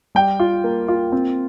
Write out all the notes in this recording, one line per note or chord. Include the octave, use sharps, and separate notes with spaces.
G3 G5
F4
A#3
F4
C4